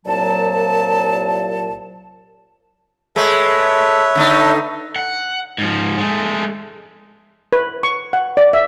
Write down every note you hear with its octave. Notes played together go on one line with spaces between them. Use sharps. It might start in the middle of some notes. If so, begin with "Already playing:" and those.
C2 A#2 F#3 A5
G#3 A3 B4 C#5 E5
D3 A3 D#4
F#5
G#2 F3
G#3 A3
B4
C#6
F#5
D5
E5